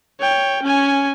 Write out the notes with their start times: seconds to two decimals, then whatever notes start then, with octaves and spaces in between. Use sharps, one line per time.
0.20 C#5 G5
0.63 C#4 G#5